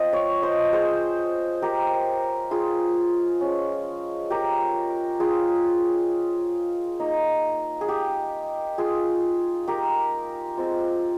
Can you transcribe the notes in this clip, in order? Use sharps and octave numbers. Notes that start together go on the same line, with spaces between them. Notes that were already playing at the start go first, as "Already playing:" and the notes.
Already playing: F3 C4 F4 D#5
C#5 F5
C5 D#5
G#4 C5
G4 A#4
F4 G#4
F3 G#3 C#4
G4 A#4
F4 G#4
A#3 D#4
G#4
G4
F4 G#4
G4 A#4
G#3 C4 F4